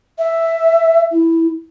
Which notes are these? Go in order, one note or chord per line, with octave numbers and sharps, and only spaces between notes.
E5
E4